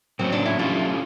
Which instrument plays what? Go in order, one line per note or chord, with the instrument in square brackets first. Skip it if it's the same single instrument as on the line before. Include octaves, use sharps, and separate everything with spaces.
[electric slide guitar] A2 F#3 A#3 C#4 [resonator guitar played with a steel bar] C4
[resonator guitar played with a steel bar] D4
E4
[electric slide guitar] F#3 A3 C#4 E4 G4 [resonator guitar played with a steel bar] F4